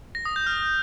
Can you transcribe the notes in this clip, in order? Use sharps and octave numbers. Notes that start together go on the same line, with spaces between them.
A#6
D#6
G6
F6